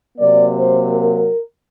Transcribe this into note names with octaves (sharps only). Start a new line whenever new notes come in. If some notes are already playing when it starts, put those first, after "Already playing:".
C3 F#3 A#3 D5
C5
A#4